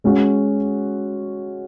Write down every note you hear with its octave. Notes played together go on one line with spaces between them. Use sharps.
G#3 C#4 F#4